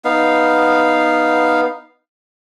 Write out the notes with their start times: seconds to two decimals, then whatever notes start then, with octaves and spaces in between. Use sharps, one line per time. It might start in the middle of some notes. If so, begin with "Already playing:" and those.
0.05 B3 D#4 F5